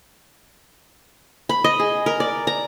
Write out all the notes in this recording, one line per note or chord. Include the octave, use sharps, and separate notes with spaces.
B5
D#5
G#4
A#4
D5
A#5